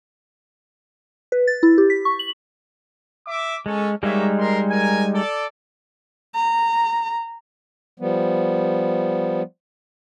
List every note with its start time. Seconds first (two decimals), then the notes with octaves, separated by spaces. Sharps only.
1.32 B4
1.47 A6
1.63 E4
1.78 G4
1.90 B6
2.05 C#6
2.19 F#7
3.27 E5 D6
3.66 G#3 C#4 A4
4.03 G3 G#3 A#3 D#4 C#5 E5
4.38 A#4 C6
4.70 A#4 G#5
5.14 A4 D5
6.35 A#5
8.00 F3 G3 B3